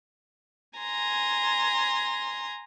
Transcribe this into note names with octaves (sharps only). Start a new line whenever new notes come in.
G#5 A#5 C6